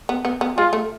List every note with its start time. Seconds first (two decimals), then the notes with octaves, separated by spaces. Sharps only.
0.09 B3
0.25 B3
0.41 B3
0.58 G#3 F4
0.73 A3